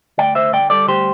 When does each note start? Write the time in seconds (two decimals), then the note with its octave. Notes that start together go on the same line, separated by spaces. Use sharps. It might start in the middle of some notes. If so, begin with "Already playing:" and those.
0.18 D2 D5 G5
0.35 D3 C5 E5
0.53 D3 D5 G5
0.70 G3 A4 D5
0.88 D2 G4 C5